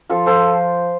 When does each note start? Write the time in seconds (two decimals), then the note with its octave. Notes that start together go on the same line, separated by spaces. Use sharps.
0.09 F3 F4 A4
0.26 F3 A4 C5